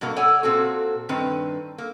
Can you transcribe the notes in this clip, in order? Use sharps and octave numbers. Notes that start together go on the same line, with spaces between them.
G2 B2 F#3 A#3
A4 C#5 D5 F#5 G#5
A#2 C4 F#4 A4
G2 D#3 C4 B4
A#3